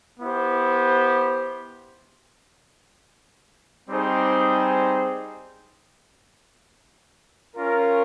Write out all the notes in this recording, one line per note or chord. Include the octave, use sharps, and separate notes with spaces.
B3 E4 G4 C5
G3 C4 D#4 G#4 C5
C#4 F4 A#4